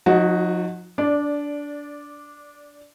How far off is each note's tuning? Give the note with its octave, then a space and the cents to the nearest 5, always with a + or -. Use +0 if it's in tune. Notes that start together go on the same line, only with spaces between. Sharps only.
F3 +45 D#4 +0 F#4 +0
D4 -15 D5 +0